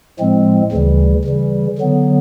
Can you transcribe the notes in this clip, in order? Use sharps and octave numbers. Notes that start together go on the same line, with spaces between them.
A2 F3 G#3 C4
D2 C#3 E3 G3
C#3 E3 G3
D3 F#3 B3